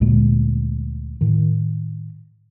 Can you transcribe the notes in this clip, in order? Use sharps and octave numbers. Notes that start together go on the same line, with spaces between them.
D2 A#2 G#3 A#3
A2 D#3